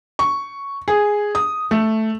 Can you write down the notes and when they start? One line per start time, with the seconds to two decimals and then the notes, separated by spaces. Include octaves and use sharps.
0.19 C#6
0.88 G#4
1.35 D#6
1.71 A3